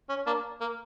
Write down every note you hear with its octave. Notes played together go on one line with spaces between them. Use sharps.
C#4
A#3 D4
A#3